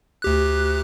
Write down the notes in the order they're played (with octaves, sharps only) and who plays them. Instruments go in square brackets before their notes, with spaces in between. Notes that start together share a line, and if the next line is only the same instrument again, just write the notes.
[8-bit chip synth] D2 G4 F#6